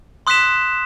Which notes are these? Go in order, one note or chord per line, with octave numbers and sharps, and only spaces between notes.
C6 D#6 F#6 B6 E7